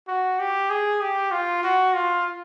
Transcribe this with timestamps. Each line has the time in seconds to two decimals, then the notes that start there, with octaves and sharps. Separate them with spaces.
0.08 F#4
0.39 G4
0.70 G#4
1.01 G4
1.32 F4
1.64 F#4
1.94 F4